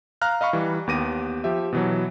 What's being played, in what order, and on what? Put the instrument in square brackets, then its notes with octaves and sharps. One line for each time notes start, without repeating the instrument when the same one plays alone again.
[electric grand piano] F5 A#5 F6 F#6
D#5 F5 B5 C#6
E3 G3
D#2 B3 G4 D6 A#6 D#7
F3 G4 E5
B2 E3 F#3